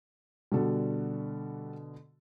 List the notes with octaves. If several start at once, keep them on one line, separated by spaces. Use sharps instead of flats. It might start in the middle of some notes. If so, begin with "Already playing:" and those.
B2 D3 G3 F#4 A4